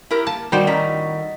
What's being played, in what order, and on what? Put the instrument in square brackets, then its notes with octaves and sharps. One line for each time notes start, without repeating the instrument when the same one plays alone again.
[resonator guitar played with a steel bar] E4 G4 A#4
[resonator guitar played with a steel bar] A#3 [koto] A5
[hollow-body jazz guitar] D#3 F#4 [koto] G3 C5
[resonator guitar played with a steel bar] A2 C#4 A#5 [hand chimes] D#5 F#5 B6